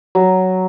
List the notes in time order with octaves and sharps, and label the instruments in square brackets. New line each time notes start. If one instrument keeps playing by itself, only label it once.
[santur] F#3